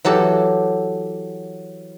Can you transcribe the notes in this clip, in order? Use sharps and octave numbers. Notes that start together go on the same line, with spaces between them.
E3 F#3 G4 A4